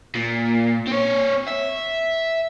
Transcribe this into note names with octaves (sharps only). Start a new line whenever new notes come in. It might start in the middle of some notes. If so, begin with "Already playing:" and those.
A#2
C4 C#5
E5